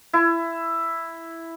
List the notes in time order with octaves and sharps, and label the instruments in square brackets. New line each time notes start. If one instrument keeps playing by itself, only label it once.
[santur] E4